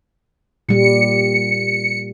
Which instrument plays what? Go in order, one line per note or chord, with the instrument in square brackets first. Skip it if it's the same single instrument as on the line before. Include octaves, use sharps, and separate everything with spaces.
[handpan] A#2 G3 [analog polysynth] C#7